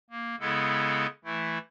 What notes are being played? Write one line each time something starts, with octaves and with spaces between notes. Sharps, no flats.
A#3
C#3 G#3 B3 E4 A4
E3 A3 E4